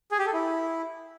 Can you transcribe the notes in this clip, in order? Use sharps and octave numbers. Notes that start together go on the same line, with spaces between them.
G#4
G4
A4
E4